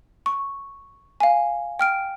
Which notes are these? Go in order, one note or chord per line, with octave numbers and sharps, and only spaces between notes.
C#6
F5 G#5
G5 F6 D7